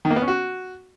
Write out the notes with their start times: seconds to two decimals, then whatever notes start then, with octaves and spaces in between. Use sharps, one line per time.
0.05 D#3
0.10 A#3
0.16 B3
0.22 C#4
0.28 F#4